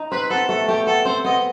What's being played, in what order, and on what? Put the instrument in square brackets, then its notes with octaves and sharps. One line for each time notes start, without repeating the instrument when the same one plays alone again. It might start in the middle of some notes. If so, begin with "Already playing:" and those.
Already playing: [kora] D#4
[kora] C4 [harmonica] B4
[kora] B3 [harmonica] A4
[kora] A3 [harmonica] A4
[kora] A3 [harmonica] G4
[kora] B3 [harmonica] A4
[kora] C4 [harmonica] C5
[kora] B3 [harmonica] D#5